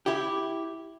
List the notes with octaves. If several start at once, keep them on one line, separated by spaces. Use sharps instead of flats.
E4 G4